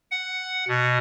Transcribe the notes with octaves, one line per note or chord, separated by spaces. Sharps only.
F#5
B2